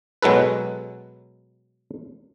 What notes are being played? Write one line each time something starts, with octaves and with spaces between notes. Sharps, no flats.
B2 F#3 G#3 A4 B4